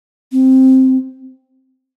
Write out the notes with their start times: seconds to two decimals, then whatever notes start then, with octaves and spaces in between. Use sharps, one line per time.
0.32 C4